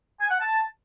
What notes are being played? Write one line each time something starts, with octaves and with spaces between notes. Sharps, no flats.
G#5
F#5
A5